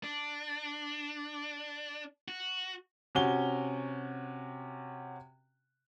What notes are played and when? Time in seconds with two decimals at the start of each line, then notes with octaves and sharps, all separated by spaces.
0.04 D4
2.28 F#4
3.15 C3 C#4 F#4 G7